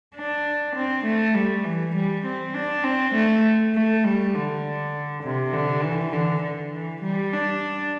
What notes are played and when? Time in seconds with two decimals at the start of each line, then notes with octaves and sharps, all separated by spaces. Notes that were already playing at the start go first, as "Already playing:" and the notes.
0.15 D4
0.76 C4
1.05 A3
1.35 G3
1.64 E3
1.95 G3
2.25 C4
2.54 D4
2.84 C4
3.15 A3
3.75 A3
4.04 G3
4.34 D3
5.23 C3
5.53 D3
5.84 E3
6.13 D3
6.42 D3
6.73 E3
7.03 G3
7.33 D4